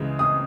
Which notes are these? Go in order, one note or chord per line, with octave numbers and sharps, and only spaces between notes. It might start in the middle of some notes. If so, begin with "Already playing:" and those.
Already playing: C#2 C#3 E3 G#3
D#6